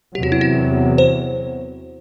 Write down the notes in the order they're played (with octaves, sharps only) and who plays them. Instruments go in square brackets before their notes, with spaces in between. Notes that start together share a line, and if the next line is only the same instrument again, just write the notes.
[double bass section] E2 C3 F#3 [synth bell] G4
[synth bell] F#4
E4
F#4
C5